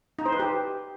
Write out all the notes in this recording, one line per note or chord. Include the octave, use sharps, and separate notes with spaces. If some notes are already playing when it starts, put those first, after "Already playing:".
D#4
C5
B4
G4